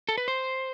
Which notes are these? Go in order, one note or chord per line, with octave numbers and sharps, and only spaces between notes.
A4
B4
C5